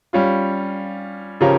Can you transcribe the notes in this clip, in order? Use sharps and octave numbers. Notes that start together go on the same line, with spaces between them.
G3 C#4 F4
C#3 F3 C#4 G4 A#4